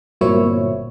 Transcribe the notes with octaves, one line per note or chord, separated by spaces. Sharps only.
G1 A#2 F#3 C4 E4 C#5